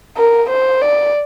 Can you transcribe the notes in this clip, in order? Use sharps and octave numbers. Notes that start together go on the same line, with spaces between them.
A#4
C5
D5